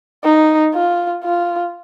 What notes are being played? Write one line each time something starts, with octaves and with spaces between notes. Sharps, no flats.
D#4
F4
F4